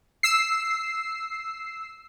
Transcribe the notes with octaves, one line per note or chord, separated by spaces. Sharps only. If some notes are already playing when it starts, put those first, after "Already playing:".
E6 C7